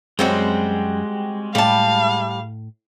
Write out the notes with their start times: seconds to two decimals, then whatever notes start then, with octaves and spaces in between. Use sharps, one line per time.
0.19 F#2 G3 G#3 C4 F#4 C5 C#5
1.55 A2 G3 F5 A5